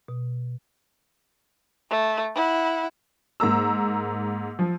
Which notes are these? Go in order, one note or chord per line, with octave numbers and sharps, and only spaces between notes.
B2
A3
E4 F#5
G#2 A#3 A#5 E6
F3